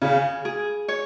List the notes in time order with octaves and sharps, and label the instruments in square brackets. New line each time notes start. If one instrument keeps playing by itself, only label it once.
[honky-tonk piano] C#3 [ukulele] G#4
[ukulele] G#4
C#5